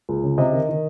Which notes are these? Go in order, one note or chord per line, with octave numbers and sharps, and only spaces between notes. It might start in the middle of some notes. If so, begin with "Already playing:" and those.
C#2
C#3
C3 D#5
D#3
D#3